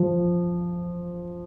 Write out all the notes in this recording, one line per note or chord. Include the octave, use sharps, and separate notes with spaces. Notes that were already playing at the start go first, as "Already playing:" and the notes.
Already playing: F3